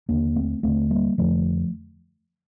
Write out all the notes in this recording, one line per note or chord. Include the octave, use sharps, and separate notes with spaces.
D#2 D3 A#3 D4
A3 C4
D#2 D3 A3 C4
G3 A#3
F2 D3 F3 A3